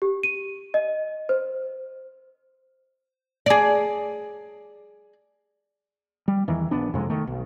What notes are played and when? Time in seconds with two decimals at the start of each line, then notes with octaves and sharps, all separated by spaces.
0.02 G4
0.23 D#7
0.74 D#5
1.29 C5
3.46 G#4 D5
6.28 G3
6.48 E2 D#3 E3
6.71 A#1 B3 D4
6.94 F2 C3 G#3
7.10 D#3 A3
7.27 B1